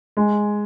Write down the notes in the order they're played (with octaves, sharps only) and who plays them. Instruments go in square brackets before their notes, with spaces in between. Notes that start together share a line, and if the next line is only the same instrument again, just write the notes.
[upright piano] G#3